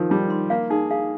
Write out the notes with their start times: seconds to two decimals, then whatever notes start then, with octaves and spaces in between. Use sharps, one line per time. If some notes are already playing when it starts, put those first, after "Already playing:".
Already playing: D#3 F3 A#4
0.10 G3 D#4
0.30 C6
0.50 A#3 F5
0.70 D#4 G#4
0.90 G#4 F5